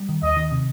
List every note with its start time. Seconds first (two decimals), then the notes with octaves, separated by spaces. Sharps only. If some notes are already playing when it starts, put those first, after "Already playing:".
Already playing: G3
0.09 D#3
0.22 D#2 D#5
0.37 D#3
0.51 C3